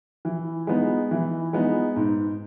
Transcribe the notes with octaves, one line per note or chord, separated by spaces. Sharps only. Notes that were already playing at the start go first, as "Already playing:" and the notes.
E3
G#3 B3 D#4
E3
G#3 B3 D#4
G#2